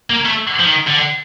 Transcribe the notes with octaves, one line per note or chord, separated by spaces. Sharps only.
A#3
A3
F3
D#3
D3